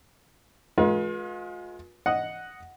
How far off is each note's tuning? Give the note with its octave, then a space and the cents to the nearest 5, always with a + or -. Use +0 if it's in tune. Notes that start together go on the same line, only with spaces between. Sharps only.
G#3 +25 F4 +40 B4 -40
D#5 +0 F#5 +0